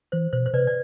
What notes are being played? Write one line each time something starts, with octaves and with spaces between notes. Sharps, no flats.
E3 C5
B2 C5
C5
C3 B4 D5
D5